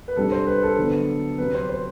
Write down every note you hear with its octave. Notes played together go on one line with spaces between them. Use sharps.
B4
C3 G3 D4 A4
C5
B4
A4
D3 F#3 B3 D4
C3 F#3 C4 B4
C5
C5